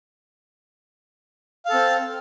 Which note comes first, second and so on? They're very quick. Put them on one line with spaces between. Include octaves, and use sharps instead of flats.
F5 A4 C4